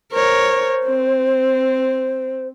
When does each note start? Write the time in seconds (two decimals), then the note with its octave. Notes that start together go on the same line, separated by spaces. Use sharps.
0.12 A#4 C5 C#5
0.86 C4